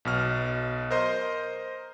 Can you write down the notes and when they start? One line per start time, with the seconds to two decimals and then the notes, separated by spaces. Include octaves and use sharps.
0.05 B1 B2 F6
0.91 A#4 C5 D#5 C6